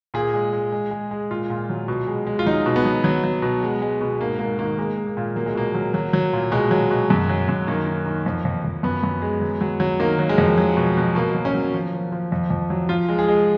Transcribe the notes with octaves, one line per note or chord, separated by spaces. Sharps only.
A#2 G#4
G#3
G#3
G#3
G#3
G#3
A#2 F4
A#2
F#3
B2
G#3
G#3
F4
F#3 D#4
B2
B3
F#3
F#3
F#3
B2
G#3
G#3
B2
G#2 A#3
G#2 A#3
D#3 A#3
G#3 A#3
G#3
A#3
A#2
F#3 A#3
G#3
B2 A#3
F#3
F#3
F#3
A#2
B2 G#3
F#3
B2
F#2
F#3
F#2
D#3 A#3
D#3
D#3
F2
F2
F2
F#2 B3
F#2
G#3
F#3
F#3
F#3
D#3 A#3
F#3
G#3
F2
F#3
B2
B2
B2 A#3
F#3
C#4
F#3
F3
F3
F3
F2
F2
F#3
F3 F4
G#3
G#4
G#3